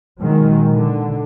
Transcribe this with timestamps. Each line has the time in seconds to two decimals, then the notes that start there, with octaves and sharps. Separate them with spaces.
0.19 A#2 D#3 F#3 G#3
0.74 D3